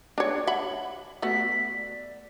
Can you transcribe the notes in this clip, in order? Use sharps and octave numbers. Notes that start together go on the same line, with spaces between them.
D4 C#5
E5 F#5 B5
A3 B3 F#4 B6
D5